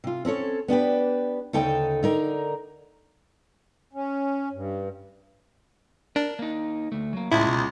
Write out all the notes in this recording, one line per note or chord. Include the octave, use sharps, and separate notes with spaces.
C3 F4
C4 C#4 A4 C#5
B3 D4 G4 B4
D2 C#3 D#4 A4 D#5 G5
D3 D#4 A#4
C#4
G2
D4 A#4
A#3 D#4
D2 A3
F#3 A#3
C#2 A2 E4
B2